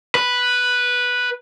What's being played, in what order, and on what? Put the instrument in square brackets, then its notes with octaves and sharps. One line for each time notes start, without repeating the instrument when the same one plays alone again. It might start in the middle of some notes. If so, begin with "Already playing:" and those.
[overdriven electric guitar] B4